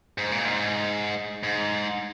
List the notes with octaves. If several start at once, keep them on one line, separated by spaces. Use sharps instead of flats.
G#2
A#2
G#2
G#2